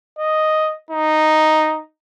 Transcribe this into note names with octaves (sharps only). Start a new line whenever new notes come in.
D#5
D#4